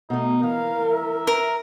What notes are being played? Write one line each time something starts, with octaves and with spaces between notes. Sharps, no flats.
B2 A3 D#4
E3 A#4 F5
E5
A#4